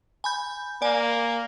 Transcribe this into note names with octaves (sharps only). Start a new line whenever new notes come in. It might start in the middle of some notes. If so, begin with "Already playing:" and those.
G#5 B5 G6
A#3 D5 G#5